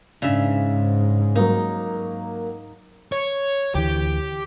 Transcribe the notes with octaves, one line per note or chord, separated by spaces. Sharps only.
G#2 C#3 D4 E5
F#3 A#3 D#4
C#5
D2 E3 G4